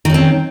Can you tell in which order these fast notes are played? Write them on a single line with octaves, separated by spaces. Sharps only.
D#3 C#4 C4